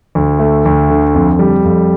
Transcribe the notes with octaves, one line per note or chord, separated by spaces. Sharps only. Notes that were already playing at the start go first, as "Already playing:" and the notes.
D2
A3
D2
D3
F2
G3
F2